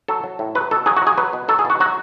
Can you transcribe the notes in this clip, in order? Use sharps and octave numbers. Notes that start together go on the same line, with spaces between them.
F#3 A4
F#3
A2
F#3 B4
B2 A4
F#3 G#4
F#4
F#3 G#4
F#3 B4
B2
F#3 A4
G#4
B2 F#4
F#3 F#4